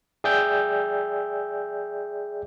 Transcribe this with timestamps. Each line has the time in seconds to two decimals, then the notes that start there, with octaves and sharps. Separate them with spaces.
0.24 G#4 D5 E5 G5 E6 G6